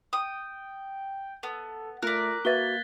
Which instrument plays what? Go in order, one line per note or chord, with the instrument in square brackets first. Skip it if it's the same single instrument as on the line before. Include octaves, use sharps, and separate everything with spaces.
[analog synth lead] G5 [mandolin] D#6
[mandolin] B3 [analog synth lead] A4
[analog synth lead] A3 [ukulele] F4 [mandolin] A#4 D5 [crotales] F#6 B6
[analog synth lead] A#3 [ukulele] F#4 B4 E5 [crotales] G#6 A6 G7